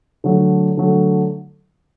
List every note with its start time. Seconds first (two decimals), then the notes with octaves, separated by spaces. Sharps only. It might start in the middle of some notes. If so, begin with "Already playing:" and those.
0.24 D3 F#3 A3
0.77 D3 F#3 A3